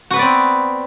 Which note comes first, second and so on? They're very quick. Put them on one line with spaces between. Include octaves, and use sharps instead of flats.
F#4 B4 B3 D5 C4